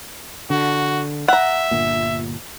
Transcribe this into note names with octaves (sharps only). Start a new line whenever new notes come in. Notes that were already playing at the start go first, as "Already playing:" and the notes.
D3 F#4
E5 F#5 A#5
G1 A#2